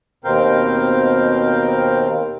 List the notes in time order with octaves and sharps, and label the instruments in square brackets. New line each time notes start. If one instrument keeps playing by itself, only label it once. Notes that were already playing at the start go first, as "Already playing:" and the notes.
[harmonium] D#2 B2 C4 A#4 F5 G5